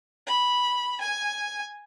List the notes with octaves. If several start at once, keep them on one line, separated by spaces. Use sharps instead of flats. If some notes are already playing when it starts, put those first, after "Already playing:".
B5
G#5